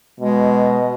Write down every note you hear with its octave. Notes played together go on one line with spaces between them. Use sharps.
B2 G#3